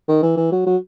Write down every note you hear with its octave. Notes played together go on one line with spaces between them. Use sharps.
D#3
E3
E3
F#3
F#3